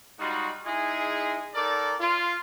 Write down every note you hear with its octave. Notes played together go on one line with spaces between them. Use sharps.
G3 G#3 D#4 F4 F#4
G#3 D#4 E4 G#4
D#3 A4 A#4 D5
F4